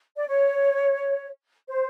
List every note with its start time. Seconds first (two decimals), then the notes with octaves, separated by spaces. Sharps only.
0.17 D5
0.28 C#5
1.68 C5